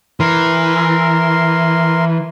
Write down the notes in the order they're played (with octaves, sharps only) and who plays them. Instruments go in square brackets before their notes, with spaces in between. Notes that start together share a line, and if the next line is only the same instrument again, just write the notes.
[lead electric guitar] E3 [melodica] A#4 C6